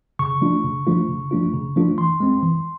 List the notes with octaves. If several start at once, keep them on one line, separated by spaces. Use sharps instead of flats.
C#3 C#6
F3 A3 D4 F4
C#3
F3 A3 D4 F4
C#3
F3 A3 D4 F4
C#3
F3 A3 D4 F4
E3 C6
G#3 C4
E3